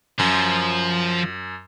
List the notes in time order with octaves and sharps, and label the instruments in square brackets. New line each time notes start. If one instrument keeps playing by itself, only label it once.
[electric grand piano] F#2 [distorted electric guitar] F3